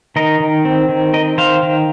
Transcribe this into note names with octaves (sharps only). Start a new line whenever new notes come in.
D#3 A#4 D#5
D#3
C4
D#3
C4 A#4 D#5
D#3 C5 F5
D#3